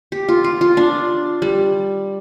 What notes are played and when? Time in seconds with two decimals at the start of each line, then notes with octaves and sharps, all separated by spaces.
0.12 G4
0.28 F4
0.44 F4
0.61 F4
0.77 D4
1.42 G3